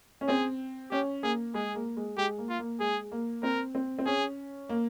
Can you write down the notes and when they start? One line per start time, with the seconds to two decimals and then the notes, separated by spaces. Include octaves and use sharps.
0.21 C#4
0.28 C4 G#4
0.91 C#4 G4
1.23 A#3 G#4
1.54 G#3 G#4
1.75 A#3
1.97 G#3
2.17 G#3 G4
2.38 A#3
2.49 F4
2.59 A#3
2.80 G#3 G#4
3.12 A#3
3.43 C4 A#4
3.75 C4
3.99 C4
4.06 C#4 G#4
4.69 A#3